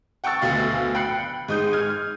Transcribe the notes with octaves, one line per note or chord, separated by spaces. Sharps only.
F#5 G5 A5 C#6 E6 A6
D2 B2 F5
G5 B5 F#6 C7 C#7
G#2 G#3 D#6 G6
F6 G#6